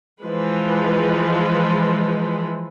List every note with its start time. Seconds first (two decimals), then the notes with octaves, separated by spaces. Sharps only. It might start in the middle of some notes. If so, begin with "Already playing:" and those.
0.22 E3 F3 G#3 B4